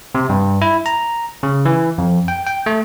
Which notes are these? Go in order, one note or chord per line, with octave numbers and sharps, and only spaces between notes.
C3
G2
E4
A#5
C#3
E3
F2
G5
G5
A3